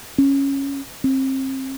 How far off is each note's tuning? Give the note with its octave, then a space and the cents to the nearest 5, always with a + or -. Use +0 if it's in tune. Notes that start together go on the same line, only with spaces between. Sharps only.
C#4 -5
C4 +30